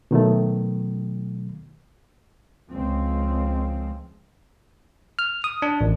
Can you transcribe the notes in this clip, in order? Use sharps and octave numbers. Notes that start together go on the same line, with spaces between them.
B2 D#3 F#3 A3
C#2 C#3 F3 C4
F6
D#6
D4
A1